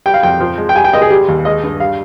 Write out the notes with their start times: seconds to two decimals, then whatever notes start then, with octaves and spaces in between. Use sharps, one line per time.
0.06 G3 G5
0.14 F5
0.23 F2 G5
0.40 F3
0.58 G#3
0.69 G5
0.76 G3 G#5
0.84 G5
0.93 C#2 D#5
1.02 G#4
1.10 G3 G4
1.28 D#2
1.45 G#3 D#5
1.63 G2
1.80 G3 F5